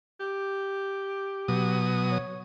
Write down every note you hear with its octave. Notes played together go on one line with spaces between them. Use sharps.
G4
B2 F#3 D#6
C#5